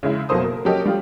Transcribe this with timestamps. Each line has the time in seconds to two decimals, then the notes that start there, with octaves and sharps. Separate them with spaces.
0.03 C#3 G#3 E4
0.29 F#1 B2 A#3 A4 C5 D#6
0.44 A#4
0.65 F#3 C#4 G4 A4 A#4 D#5
0.85 G3 F4 G4